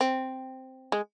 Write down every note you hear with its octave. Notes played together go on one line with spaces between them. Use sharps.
C4
G#3